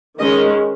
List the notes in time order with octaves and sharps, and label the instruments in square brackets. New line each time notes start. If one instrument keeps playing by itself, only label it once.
[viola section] D#3 G#3 C#4 D#5